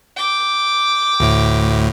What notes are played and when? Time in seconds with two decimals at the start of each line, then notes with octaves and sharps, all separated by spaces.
0.16 G5 D6
1.20 D2 A2